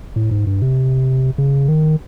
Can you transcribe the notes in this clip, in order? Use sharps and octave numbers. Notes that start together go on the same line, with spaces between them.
A2
G#2
G2
C3
C#3
D#3